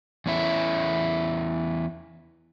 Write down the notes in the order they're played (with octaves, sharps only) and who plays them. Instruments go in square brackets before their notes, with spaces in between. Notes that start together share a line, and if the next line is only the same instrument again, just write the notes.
[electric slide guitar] E2 C#4 E4